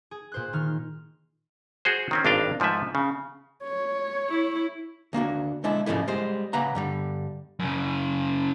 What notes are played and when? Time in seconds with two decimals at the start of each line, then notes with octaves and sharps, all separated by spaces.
0.11 G#4
0.32 A#2 C5 F#6
0.53 D#3 F6
1.85 F#4 G#4 C5
2.11 D#3 C4 C#4
2.25 G#1 G2 D4 D#5 F5 G5
2.60 G#2 F3 A3 B4 E5
2.95 C#3
3.64 C#5
4.30 E4
5.13 D2 A#3 D4 F#4
5.64 D3 G#3 D4 E4 A5
5.86 F2 G#2 C#3 F3 A3 E4
6.08 G3 G#3 C5
6.53 C#3 A#3 B4 F#5 A#5
6.75 G2 D3 G3
7.59 F#2 C#3